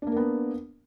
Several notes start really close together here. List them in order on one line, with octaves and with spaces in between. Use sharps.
D4 A#3 A#4 B3